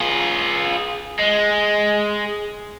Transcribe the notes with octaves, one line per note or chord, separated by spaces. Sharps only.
F4 G#4
G#3